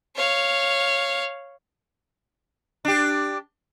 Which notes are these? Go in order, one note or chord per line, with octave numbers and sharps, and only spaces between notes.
C#5 F5
D4 G4